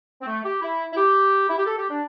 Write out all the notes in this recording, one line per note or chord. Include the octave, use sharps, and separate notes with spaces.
C4
A3
G4
E4
E4
G4
E4
G4
A4
G4
D4